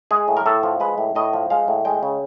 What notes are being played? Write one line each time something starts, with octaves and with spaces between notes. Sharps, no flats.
G#3 G#4
A2
A#4
A2 A4
F3
G#3 B4
A2
A2 D#5
F3
G#3 F5
A2
G#3 G5
C#3